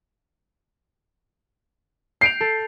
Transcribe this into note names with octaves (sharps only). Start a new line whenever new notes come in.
G6 C7 D7 F7
A4